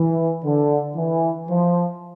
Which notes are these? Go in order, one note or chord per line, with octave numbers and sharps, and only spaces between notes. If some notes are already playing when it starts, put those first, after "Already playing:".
Already playing: E3
D3
E3
F3